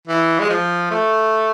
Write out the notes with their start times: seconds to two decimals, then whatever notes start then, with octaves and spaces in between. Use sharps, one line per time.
0.07 E3
0.39 G#3
0.50 F3
0.91 A3